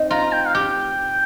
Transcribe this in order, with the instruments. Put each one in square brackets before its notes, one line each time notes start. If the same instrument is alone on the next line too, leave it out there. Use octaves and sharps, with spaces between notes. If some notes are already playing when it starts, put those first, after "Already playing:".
Already playing: [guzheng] C4 D#4
[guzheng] F4 [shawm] A#5
[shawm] G5
F5
[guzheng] G4 [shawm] G5